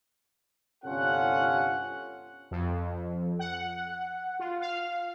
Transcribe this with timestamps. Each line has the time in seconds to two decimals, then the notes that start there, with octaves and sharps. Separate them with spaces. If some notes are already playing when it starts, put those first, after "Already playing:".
0.84 G1 C3 C#4 F4 A4 F#5
2.51 F2
3.39 F#5
4.39 F4
4.61 F5